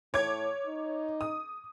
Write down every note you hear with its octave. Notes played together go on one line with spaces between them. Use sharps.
A2 C#5 D6 G#6
D#4
D#6